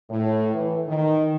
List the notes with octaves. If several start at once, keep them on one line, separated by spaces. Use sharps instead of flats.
A2
E3
D#3